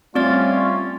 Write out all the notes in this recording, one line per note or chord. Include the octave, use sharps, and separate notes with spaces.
G3 A3 C4 C#4 F4 D5 A6